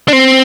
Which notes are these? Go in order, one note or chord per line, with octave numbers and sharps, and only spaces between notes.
D4
C4